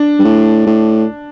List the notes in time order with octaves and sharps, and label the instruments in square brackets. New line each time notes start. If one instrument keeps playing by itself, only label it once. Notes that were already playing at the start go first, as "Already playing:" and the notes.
Already playing: [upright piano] D4
[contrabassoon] G2
A2
A2